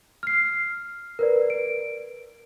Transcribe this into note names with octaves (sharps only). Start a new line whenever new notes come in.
F6 C7
A#4 B4 D5
D7